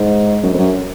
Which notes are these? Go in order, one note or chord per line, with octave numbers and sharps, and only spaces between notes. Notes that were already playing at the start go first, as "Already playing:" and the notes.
Already playing: G#2
F#2
F2
F#2